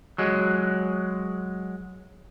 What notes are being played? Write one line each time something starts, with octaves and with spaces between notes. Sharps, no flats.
F#3 G#3